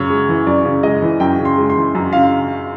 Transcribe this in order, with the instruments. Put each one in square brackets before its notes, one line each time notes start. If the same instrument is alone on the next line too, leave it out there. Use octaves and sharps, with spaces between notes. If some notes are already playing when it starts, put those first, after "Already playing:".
Already playing: [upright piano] F#2 C#3 C#5
G#3
E3
F#2 D5
C#3
G#3 D#5
E3
F#2 G5
C#3
C6
G#3
C6
E3
F#2
C#3 F5